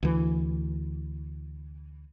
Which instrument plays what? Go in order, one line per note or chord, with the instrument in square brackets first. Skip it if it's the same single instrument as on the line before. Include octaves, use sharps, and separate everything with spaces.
[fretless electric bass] D2 E3